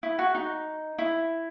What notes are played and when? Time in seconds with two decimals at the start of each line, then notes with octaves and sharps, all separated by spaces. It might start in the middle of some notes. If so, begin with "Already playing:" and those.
0.03 E4
0.19 F#4
0.34 D#4
0.98 E4